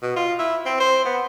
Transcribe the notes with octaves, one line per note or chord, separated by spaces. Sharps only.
B2
F4
E4
C4
C5
B3